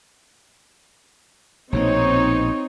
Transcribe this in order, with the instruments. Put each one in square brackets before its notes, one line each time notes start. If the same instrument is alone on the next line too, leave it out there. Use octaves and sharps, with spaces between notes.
[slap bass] A#1 B2 A#3 [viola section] C4 D#4 C#5